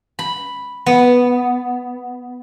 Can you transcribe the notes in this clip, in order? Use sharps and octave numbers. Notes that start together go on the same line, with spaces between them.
B5
B3